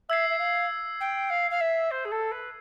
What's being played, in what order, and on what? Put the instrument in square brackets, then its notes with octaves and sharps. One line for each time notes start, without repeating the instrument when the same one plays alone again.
[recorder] E5 [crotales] E6 G#6 C7
[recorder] E5
F5
G5
F5
F5
E5
C5
G#4
A4
B4